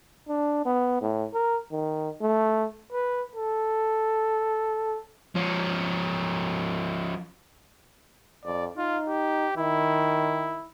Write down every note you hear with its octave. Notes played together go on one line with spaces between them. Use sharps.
D4
B3
A2
A#4
D#3
A3
B4
A4
F3 C#4
F2 D5
D#4 F4
G4
D#3 E4